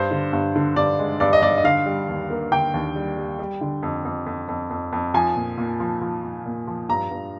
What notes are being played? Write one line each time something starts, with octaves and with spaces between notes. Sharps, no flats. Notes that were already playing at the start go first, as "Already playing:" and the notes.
Already playing: G2 C5
D3
G2
D3
G2 D5
G#3
G2 D5
D#5
G2 D5
D#5
D3 F5
G3
D#2
A#3
D3 G5
D#2
G3
G3
G3
D3
F2
F2
F2
F2
F2
F2
F3 G#5
A#2
A#2
F3
F3
F3
A#2
F3
G2 A#5
G2